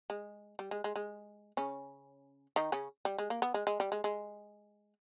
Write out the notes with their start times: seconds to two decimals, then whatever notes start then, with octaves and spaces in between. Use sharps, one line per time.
0.10 G#3
0.59 G3
0.71 G#3
0.84 G#3
0.96 G#3
1.57 C#3 C#4
2.56 D#3 D#4
2.72 C#3 C#4
3.05 G3
3.18 G#3
3.30 A#3
3.42 B3
3.54 G#3
3.67 G#3
3.80 G3
3.92 G#3
4.04 G#3